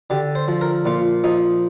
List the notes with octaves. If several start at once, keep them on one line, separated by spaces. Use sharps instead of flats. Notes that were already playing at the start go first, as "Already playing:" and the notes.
D3 G4
C5
F3
A#4
A#2 F4
F3 D#4